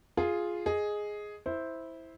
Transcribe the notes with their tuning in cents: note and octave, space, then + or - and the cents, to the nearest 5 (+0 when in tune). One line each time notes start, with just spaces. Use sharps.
F4 +0 G#4 +0
G#4 +5 D#5 +0
E4 -10 C5 +0